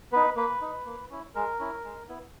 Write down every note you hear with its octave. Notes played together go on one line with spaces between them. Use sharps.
B3 D#4 B4
A#3 B4
D#4
A#3
C#4 E4
G#3 A#4
C#4 E4
G#3
B3 E4